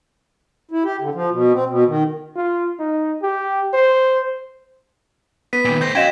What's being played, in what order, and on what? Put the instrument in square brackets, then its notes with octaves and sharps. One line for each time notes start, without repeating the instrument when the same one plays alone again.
[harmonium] E4
G4
D3
F3
B2
C4
B2
D#3
[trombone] F4
D#4
G4
C5
[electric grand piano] B3 [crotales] B6 D#7
[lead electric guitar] A#2 D#3
[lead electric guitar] A3 C5 [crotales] G6 A#6
[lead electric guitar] C#4 F#4 [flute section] D#5 F5 [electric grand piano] G5 [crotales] G#6 E7